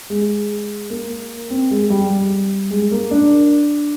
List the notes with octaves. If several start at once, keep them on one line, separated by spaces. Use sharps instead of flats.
G#3
A#3
C4
G#3
G3
G3
G#3
A#3
D4